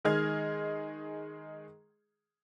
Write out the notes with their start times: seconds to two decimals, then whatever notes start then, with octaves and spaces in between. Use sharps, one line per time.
0.05 D#3 G#3 G#4 D#5 F6 G#6